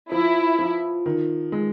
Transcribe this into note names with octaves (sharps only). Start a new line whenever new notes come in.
F3 E4
F3
D#3
G#3